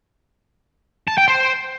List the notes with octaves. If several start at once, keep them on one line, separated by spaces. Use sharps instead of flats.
A5
G5
C5